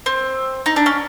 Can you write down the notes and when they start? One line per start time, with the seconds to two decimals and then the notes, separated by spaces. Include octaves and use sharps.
0.06 C4
0.66 D#4
0.76 D4
0.86 C#4